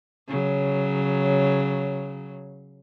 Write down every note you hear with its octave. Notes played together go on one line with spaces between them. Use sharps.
C#3 F#3